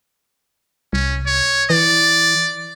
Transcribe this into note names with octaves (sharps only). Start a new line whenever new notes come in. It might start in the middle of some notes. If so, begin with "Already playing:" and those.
C2 C#4
C#5
E3 D5